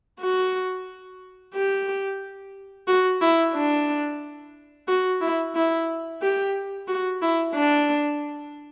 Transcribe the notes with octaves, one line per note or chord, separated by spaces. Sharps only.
F#4
G4
F#4
E4
D4
F#4
E4
E4
G4
F#4
E4
D4